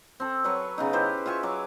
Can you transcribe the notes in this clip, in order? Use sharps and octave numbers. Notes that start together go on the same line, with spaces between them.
C4 A4
F#3 B4 C#5 C#6
C#3 B3 D#4
E4 G4 B4 C5
F4 E5 G#5 C#6
F#3 D6